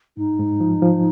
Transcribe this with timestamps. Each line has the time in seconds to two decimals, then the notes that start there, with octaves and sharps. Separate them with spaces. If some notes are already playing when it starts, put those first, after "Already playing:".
0.17 G#2 D#4
0.39 G#2
0.60 F3
0.82 F3